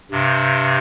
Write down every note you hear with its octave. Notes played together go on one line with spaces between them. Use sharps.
G2 C3